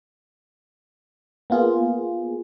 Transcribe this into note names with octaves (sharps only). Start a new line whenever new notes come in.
A#3 B3 F4 G#4